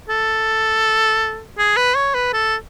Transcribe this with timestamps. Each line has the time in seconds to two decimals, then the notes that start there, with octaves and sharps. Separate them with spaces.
0.09 A4
1.58 G#4
1.77 B4
1.95 C#5
2.14 B4
2.33 A4